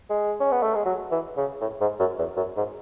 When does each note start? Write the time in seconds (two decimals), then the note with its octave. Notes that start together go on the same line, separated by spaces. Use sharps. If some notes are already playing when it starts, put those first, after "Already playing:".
0.10 G#3
0.40 C#4
0.52 B3
0.63 A3
0.75 G#3
0.86 F#3
1.12 E3
1.37 C#3
1.61 A2
1.81 G#2
2.00 F#2
2.19 E2
2.37 F#2
2.57 G#2